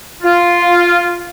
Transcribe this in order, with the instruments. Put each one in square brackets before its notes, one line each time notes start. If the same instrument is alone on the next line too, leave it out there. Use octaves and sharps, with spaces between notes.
[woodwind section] F4